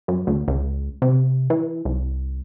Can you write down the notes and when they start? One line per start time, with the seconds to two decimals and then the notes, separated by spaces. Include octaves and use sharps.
0.08 F#2
0.27 D2
0.48 C#2
1.02 C3
1.50 E3
1.85 C2